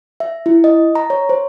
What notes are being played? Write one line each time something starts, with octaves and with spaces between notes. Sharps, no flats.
E5
E4
D#5
A#5
C#5
C5